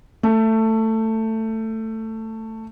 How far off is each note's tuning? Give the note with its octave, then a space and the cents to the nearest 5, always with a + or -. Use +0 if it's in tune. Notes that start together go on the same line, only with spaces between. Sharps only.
A3 +15